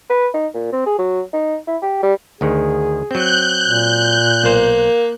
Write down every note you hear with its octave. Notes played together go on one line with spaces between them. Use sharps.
B4
D#4
A#2
C4
G#4
F#3
D#4
E4
G4
G3
D2 D#3 G#4
F#3 C4 F#6 G6
A#2
B1 A#3 C5